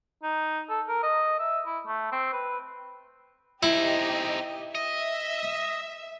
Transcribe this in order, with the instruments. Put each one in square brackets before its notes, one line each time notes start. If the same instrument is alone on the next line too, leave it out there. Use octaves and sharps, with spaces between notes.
[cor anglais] D#4
A4
A#4
D#5
E5
E4
A3
C4
B4
[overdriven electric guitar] C4 D#4 [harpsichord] E4 [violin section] G4 D#5
[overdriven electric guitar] D#5 [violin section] E5